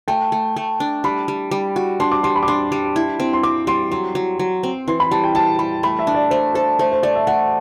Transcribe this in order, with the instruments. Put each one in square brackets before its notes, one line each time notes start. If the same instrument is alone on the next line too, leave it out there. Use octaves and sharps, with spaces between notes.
[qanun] A3 [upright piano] G5
[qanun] A3
A3
D4
[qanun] G3 [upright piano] B5
[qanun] G3
G3
F#4
[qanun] D4 [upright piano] C6
[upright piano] D6
[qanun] G3 [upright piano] C6
[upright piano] B5
D6
[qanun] D4 [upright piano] C6
[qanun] G3
E4
C4
[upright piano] C6
[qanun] C4 [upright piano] D6
[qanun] G3 [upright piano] C6
[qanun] F#3 [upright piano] C6
[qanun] F#3
F#3
C4
[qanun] E3 [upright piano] C6
[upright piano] B5
[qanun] G3 [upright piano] A5
[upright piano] G5
[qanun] G3 [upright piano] A5
[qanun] G3 [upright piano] B5
[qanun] A3 [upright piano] B5
[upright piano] E5
[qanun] D4
[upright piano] D5
[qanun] A3 [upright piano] C5
[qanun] A4 [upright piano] C5
[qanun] A3 [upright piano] C5
[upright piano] C5
[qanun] A3 [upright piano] D5
[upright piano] E5
[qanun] A3 [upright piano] F#5